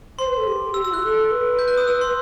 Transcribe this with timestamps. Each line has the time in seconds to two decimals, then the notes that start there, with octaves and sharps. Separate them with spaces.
0.19 C5 C6
0.28 B4
0.37 A4
0.47 G4
0.74 G4 E6
0.84 F#4 E6
0.93 E4 F#6
1.03 A4
1.31 B4
1.59 G6
1.68 F#6
1.77 D#6
1.88 E6
2.01 C6